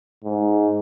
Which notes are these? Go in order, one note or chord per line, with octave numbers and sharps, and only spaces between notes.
G#2